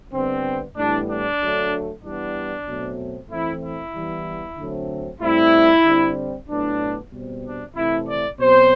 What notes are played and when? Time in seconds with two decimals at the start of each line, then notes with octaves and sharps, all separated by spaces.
0.13 D3 G3 B3 C4
0.76 A2 E3 G3 B3 D4
1.08 D4
1.40 D3 F#3 A3
2.03 E3 G3 B3 D4
2.67 B2 F#3 A3 C4
3.30 E3 A3 C4 E4
3.62 E4
3.93 E3 G3 B3
4.57 D3 F#3 A3 C4
5.21 A2 G3 C4 E4
5.85 D3 G3 C4
6.48 A2 F#3 B3 D4
7.11 B2 G3 C4
7.43 D4
7.75 C3 E3 A3 C4 E4
8.07 D5
8.39 B2 F#3 C4 C5